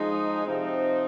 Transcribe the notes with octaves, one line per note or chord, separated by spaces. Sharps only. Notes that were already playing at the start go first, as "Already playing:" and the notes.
Already playing: F3 G#3 D#4
C3 F3 C4 D#4